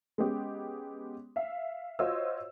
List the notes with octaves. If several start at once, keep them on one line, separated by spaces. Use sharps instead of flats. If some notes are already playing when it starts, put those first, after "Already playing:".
G#3 B3 C#4 G4
E5 F5
F4 F#4 C5 C#5 D#5 E6